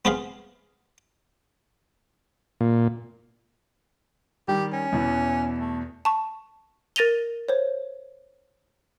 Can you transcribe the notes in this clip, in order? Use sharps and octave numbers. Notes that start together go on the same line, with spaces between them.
B3 C4 G4 G#4 F5 B5
A#2
D#3 G3 G4
C#4
E2 B2 E3
A3
A5 C#6
A#4 A6 A#6 D#7 F7 G7
C5 C#5